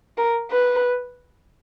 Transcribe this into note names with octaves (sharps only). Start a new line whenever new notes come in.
A#4
B4